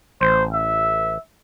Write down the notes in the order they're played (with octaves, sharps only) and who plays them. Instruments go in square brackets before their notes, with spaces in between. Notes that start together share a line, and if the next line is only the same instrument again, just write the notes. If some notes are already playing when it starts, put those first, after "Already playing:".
[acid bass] A1 [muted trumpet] C5
[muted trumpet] E5